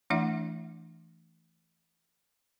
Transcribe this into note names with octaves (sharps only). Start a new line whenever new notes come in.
E3 A3 D4 E4 E5 F#5